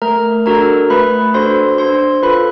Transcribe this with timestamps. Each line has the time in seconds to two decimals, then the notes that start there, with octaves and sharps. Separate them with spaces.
0.02 A3 A#4 A#5
0.46 D4 F#4 A4 A#4 A#5
0.90 A3 B4 B5
1.34 D4 F#4 A4 C5 C6
1.78 D4 C5 C6
2.23 F4 A4 B4 B5